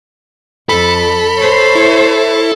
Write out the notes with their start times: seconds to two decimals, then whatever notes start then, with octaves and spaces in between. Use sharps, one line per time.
0.69 F2 A4 B5
1.38 C5 C#5
1.75 E4